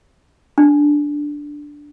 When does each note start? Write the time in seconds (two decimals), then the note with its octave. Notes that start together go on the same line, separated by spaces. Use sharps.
0.58 D4